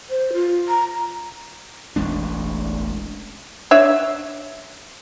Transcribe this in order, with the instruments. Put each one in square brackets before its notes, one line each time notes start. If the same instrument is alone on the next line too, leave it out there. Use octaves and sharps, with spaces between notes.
[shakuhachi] C5
F4
A#5
[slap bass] E1 A1 G#3 D4
[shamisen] D4 C#5 E5